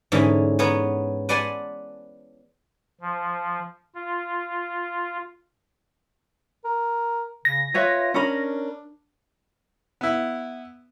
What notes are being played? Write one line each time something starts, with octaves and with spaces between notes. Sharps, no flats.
G#2 D3 E3 C#4
B3 C#4 C#5 A#5
B4 D5 F#5 G#5 A5 C6
F3
F4
A#4
C#3 A#6
F4 B4 C#5 E5
C#4 D4 A#4 B5
B3 E4